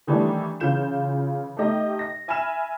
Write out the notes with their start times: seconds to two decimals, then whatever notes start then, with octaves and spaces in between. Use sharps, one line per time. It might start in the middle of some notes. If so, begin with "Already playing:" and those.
0.07 D#3 E3 G3 A3 D4 E4
0.60 C#3 E3 F4 G6 E7
1.57 A3 D#4 G4 D#5 E5
1.99 A#6
2.28 E5 G#5 B5 F6 E7